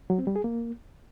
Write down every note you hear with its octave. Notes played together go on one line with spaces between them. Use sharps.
F#3
C4
G3
G#4
A#3